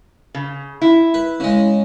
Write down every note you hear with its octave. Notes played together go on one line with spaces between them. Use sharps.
C#3
E4
B4
C#3 G#3